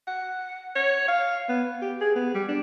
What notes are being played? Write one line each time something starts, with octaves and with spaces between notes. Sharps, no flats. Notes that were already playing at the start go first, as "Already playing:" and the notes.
F#5
C#5
F5
B3
G4
G#4
B3
G3
D4